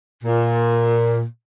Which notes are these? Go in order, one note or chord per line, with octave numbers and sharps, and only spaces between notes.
A#2